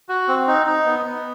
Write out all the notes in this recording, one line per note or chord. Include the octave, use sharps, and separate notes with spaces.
F#4
C4
D#4
D#4
B3
B3